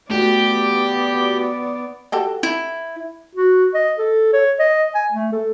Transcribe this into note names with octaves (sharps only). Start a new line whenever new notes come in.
A3 B3 F#4 G4 D5
F#4 G4 A4
E4
F#4
D#5
A4
C#5
D#5
G#5
A3
A4